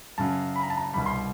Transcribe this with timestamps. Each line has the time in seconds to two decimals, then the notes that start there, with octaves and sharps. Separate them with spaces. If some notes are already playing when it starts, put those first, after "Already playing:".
0.18 F#2 C#3 F#3 A5
0.56 B5
0.63 A#5
0.70 A5
0.77 A#5
0.93 C2 B2 G3 B5
1.06 C6